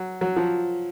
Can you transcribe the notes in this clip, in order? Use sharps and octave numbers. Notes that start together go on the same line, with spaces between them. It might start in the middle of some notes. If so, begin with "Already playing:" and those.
Already playing: F#3
F#3
F3